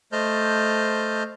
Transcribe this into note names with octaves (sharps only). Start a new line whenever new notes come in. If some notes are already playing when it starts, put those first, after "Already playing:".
A3 C5 D#5 A5 F6 G6